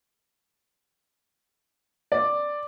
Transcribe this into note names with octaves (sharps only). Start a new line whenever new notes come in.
D5